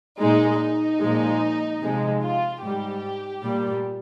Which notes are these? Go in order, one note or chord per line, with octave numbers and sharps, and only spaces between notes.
A#2 G#3 D#4
D#4
A#2 F3 G#3
C3 F3 G#3
F4
G#2 G3 G4
A#2 G3